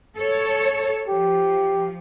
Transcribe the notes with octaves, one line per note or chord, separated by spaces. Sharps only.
A4 C#5
F3 G4